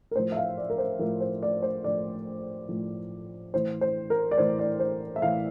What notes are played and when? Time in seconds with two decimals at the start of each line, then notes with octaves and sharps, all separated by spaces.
0.11 A#4
0.16 A2 F3 C5
0.32 E5
0.37 F5
0.57 D5
0.70 A#4
0.78 C5
0.99 A2 F3 A#4
1.20 C5
1.43 D5
1.63 C5
1.84 A2 F3 D5
2.69 A2 F3
3.53 A2 E3 C5
3.81 C5
4.10 A#4
4.31 D5
4.38 A2 E3 C5
4.59 D5
4.80 C5
5.16 E5
5.22 A2 E3 F5